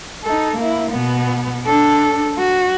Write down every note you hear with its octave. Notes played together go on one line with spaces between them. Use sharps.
D#4 A4
A#3 E4
B2 B3
D4 A4
F#4